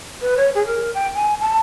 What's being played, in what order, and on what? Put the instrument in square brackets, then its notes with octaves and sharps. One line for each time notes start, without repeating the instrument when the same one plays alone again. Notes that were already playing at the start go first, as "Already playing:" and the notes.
[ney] B4
C#5
G#4
A#4
G5
G#5
A5